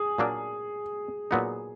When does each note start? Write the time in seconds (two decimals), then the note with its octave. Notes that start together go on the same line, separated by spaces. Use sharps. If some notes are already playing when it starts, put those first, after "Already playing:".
Already playing: G#4
0.18 A#2 F#3 A#3 D4
1.31 A#2 F#3 B3 D#4